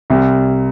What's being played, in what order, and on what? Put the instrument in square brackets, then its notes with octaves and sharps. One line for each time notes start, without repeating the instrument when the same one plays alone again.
[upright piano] C2